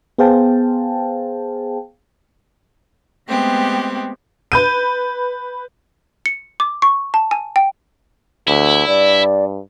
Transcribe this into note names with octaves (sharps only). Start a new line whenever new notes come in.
B3 G#4 C5 F5 G5 A5
G#3 A3 B3 C4 G4
B4 G6 D#7
C#7
D6
C#6
A5
G#5
G5
D2 E4
G2 D5